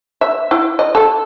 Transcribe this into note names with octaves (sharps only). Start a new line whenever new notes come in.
E5
E4
D#5
A4